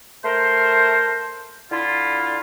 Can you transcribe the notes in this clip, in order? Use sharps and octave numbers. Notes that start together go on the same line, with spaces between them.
A3 A#4 C5
D3 E4 F4